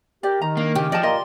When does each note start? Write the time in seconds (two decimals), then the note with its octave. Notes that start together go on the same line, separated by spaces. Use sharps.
0.23 G4 A#4 D5
0.42 D#3 A#5
0.57 A#3 D4
0.75 C#3 G4
0.92 F3 D5 D#5 A5
1.03 A#2 A#3 D#5 A#5 C6